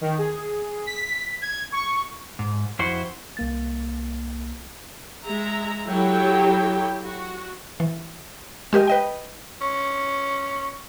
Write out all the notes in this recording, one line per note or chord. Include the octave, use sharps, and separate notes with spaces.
D#3
G#4
B6
G#6
C#6
G#2
F2 E4 F#4 C5
C2 A#3 A6
G#3 E5 A#5
F#3 E4 G4 A4 G5
F#4
E3
G#3 G4 A#4 D#5
B4 D#5 G5
C#4